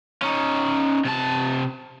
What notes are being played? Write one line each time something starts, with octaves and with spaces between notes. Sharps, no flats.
C#4 D#4
C3 A5